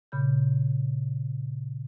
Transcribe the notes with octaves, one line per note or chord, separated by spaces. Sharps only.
A#2 C#3 B5 G6